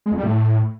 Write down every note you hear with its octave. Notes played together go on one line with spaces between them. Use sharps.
G#3
F2
G3
A2